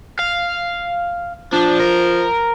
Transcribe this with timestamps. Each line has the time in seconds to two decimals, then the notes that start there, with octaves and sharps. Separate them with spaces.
0.19 F5
1.53 F3 D4
1.80 A#4